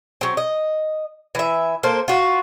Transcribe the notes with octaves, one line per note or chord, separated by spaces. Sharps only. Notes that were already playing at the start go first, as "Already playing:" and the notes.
F#3 C4
D#5
E3 E5
A#3 A4 C5
F4 F#4